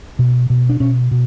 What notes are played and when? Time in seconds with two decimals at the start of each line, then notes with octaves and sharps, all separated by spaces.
0.19 B2
0.50 B2
0.69 D4
0.80 B2 C#4
1.11 B2